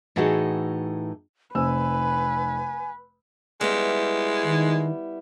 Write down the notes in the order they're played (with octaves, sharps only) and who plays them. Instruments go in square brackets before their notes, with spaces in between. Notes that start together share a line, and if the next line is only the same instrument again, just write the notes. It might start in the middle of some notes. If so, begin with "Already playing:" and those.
[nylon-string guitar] A2 E3 D#4 F#4 G#4 A4
[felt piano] F1 C4 E6 [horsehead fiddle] B4 [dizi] G#5
[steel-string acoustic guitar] G3 B3 E4 [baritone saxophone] G#3
[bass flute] D#3